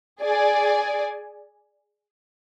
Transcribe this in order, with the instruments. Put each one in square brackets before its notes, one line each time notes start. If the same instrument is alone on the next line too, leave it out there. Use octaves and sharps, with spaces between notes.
[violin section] G#4 D5 G#5